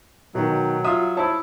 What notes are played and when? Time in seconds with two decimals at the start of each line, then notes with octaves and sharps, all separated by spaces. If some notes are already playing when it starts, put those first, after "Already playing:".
0.35 B2 D#3 F#3
0.85 F4 E5 D#6
1.17 E4 C5 C#5 A5